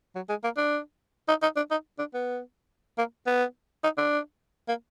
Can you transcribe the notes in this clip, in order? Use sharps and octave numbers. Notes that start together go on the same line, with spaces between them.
F#3
G#3
A#3
D4
D#4
D#4
D4
D#4
D4
B3
A#3
B3
D#4
D4
A#3